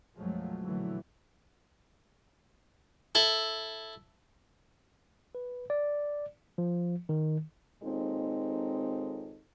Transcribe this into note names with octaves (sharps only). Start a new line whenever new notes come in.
B1 F#2 F3 F#3 G#3 A3
A#2 D3 E3 F#3 A3
E4 A4
B4
D5
F3
D#3
D#2 A#2 G#3 C4 D#4 A4